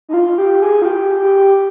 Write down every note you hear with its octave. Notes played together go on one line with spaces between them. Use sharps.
D#4
F4
G4
G#4
F4
G4
G4